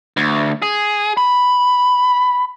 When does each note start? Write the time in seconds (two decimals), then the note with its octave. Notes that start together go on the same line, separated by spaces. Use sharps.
0.17 D2
0.62 G#4
1.17 B5